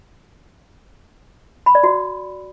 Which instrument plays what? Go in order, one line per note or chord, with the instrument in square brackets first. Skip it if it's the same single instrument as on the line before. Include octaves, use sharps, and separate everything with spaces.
[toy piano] B5
D5
F#4